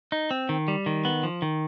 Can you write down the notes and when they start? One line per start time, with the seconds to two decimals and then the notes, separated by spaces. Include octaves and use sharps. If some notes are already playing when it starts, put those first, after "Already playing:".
0.12 D#4
0.31 C4
0.49 D#3
0.68 G3
0.86 D#3
1.05 B3
1.23 F3
1.42 D#3